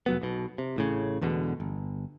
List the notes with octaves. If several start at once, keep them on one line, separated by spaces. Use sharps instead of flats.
F1 F#3 B3
B1 B2
C3
A1 A2 C#3
E1 E2 B2 D3
G1